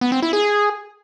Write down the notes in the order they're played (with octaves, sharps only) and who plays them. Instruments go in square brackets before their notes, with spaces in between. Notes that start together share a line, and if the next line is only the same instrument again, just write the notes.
[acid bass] B3
C4
E4
G#4